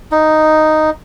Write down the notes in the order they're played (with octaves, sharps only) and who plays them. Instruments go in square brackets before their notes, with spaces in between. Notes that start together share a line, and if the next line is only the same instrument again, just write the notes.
[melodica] D#4